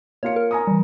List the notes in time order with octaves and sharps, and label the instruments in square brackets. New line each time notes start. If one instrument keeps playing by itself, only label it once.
[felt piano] A#3 F4 C#7 [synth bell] C#5
[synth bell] A#4
[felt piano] G#5 A#5 D#6
[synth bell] E3 G3